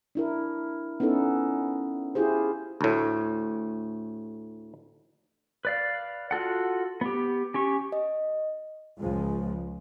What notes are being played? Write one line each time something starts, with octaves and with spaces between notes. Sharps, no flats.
D4 E4 A#4
B3 C#4 D#4 E4 A4
E4 F4 G4 G#4 C5
D2 A2
B4 D5 F5
F4 F#4 A4 F#5
B3 G4
C#4 G4 C#6
D#5
C#2 F3 G#3